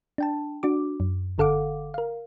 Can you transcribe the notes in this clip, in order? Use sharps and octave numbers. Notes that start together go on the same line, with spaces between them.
D4 G5 A5
D4 F#4 D6
F#2
G1 D3 A4 F5 F#5 D6
A#4 F5